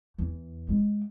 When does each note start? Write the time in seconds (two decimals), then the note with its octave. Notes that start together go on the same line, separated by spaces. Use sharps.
0.18 E2
0.69 G#3